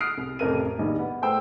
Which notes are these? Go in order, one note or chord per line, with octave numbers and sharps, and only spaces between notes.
D#6 F6 F#6 C7 D7
C2
A1 F2 C3 A#4 F6 D#7
A#1 D#3 G3
B3
A2 B3 C5 G5 E6